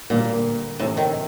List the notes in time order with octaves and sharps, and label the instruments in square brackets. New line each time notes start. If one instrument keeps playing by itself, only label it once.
[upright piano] D2 D3 G3 A#3 [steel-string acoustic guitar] A#2
[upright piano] D2 C3 E3 A3 C#4 [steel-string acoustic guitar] A2
[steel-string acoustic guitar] D#3